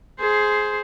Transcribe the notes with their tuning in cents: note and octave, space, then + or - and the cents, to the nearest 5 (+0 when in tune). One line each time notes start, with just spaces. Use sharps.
G#4 +15 C5 +0